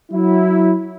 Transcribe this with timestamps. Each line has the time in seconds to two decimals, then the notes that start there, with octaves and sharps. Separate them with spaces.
0.12 F#3 E4